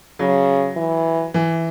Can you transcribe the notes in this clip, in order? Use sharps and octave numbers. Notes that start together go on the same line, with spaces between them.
C#3 F#3
E3
E3